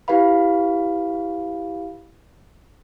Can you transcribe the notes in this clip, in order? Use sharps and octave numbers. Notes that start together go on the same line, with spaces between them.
E4 G4 B4 F5 B5